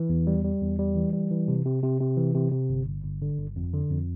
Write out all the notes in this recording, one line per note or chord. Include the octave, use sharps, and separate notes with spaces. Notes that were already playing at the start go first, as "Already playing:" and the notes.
Already playing: E3
E2
G3
G3
E2
G3
E3
G3
E3
C3
C3
C3
C3
E3
C3
C3
G1
G1
G1
D3
G1
F2
D3
F2